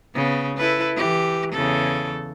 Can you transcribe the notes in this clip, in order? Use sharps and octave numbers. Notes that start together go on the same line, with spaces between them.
C#3 B3
E4 A4 B4
E3 G4
E2 C#3 A4